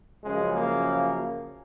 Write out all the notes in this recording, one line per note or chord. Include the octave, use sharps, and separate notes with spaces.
F#2 C#3 F3 G#3
A#3